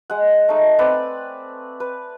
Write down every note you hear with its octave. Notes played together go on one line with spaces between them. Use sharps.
G#3 F#5
A3 D#4
C4 B4 D5
B4